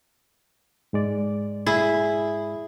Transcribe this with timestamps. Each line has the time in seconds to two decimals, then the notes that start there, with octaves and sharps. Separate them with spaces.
0.93 G#2 G#3 D5
1.66 E4 G#4